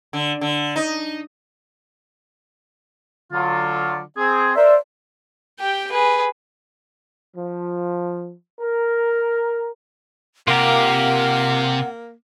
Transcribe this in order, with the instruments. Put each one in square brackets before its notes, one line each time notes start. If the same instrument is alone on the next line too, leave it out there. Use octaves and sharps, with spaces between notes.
[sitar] D3
D3
D#4
[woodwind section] D3 F#3 F4
C4 G#4
[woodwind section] A#4 C5 E5 [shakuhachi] D5
[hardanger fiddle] G4 G5
G#4 B4
[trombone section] F3
A#4
[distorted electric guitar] C3 [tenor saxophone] A#3 [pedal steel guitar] F4 G4 A#4 [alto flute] F#5